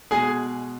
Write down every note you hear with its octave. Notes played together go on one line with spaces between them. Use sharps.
B2 G#3 G#4 G#5